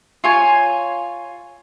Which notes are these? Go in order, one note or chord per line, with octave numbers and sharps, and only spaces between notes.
F4 C#5 G#5